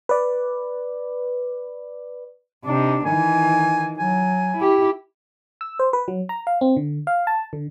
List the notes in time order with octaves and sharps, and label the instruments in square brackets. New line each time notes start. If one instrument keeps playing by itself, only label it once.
[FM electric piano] B4 D5
[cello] C3 D4 [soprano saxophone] D#4
[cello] D#3 E3 [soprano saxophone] G#5
[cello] F#3 [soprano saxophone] G#5
[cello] E4 G4
[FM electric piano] E6
C5
B4
F#3
A#5
F5
C4
D3
F5
A5
D3